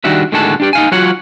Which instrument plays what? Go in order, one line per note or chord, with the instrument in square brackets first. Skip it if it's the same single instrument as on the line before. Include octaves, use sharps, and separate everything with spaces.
[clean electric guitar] D#3 G3 D4 F#4 E5
A2 D3 D#3 G#3 F#4 A5
D4 G4 D5
D#4 F5 G#5
F#3 F4 F#4 C#5 F#5